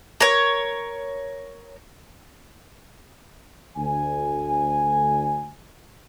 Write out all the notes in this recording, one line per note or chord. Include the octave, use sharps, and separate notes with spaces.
A#4 C#5
D2 G#5